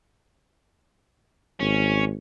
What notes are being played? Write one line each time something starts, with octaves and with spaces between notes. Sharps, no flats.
G#1 C#4